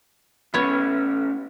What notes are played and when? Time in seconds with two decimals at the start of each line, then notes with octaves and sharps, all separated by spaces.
0.54 A2 B3 C#4 C#5